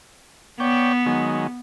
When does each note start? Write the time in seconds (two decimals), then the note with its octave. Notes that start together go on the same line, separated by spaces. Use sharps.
0.60 B3 C#5 D5 G5
1.06 D#3 F#3 G#3